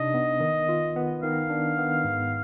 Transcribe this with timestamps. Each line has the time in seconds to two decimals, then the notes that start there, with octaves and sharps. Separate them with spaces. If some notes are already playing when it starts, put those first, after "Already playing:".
Already playing: C3 D4 D#4 D#5
0.14 B3
0.40 D#3
0.69 F4
0.96 B3
1.23 D#3 F5
1.50 D4
1.78 B3
2.04 G#2